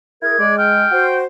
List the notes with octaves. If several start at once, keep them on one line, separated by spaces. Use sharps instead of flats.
E4 G#4 A#4 G#6
G#3 G#4 D5
G5 F6
F#4 C5